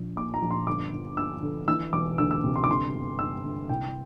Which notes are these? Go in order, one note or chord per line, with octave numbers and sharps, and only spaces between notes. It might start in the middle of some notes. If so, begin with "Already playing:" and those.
Already playing: A#1 A#2
A#2 D6
A#5
A#1
C6
G1 D6
G1
G2 E6
D3
E3 E6
E1 D6
D2 E6
E6
C3
C6
D6
G1 C6
G1
G2 E6
D3
C2 G5